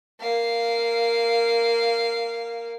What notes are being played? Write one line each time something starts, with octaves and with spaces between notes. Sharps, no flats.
A#3 F5